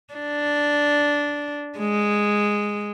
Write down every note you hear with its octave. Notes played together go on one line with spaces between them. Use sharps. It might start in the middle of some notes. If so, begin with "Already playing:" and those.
D4
G#3